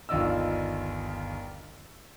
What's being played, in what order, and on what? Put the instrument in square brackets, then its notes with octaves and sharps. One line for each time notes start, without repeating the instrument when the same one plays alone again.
[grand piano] G1 D#2 F4 D5 D#5 E6